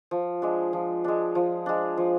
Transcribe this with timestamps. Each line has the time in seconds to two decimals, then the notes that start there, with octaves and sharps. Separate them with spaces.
0.11 F3
0.42 G#3 D4
0.73 F3
1.04 G#3 D4
1.35 F3
1.66 G#3 D4
1.97 F3